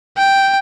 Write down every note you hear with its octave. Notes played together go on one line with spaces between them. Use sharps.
G5